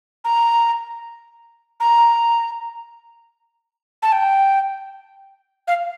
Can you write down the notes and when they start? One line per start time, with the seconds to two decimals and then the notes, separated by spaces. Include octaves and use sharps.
0.25 A#5
1.80 A#5
4.02 A5
4.12 G5
5.68 F5